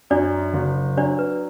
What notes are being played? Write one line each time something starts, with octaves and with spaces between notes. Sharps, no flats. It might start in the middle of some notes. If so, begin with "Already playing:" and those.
F#2 D4 D5
F#1
F#3 D4 D5
B4